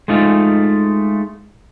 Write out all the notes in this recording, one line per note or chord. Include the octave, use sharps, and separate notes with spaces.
G#3 A3 D#4 F4